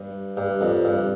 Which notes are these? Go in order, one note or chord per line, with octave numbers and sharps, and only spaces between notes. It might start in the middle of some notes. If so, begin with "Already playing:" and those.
Already playing: G2
G2
F2
G2